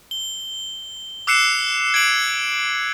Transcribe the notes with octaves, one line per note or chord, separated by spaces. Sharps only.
G7
D6 E6 F#6 C7 C#7 E7
G#6 D7 F#7